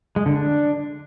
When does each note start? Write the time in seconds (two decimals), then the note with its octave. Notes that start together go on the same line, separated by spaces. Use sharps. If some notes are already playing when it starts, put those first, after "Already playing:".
0.16 G#3
0.26 D3
0.36 D4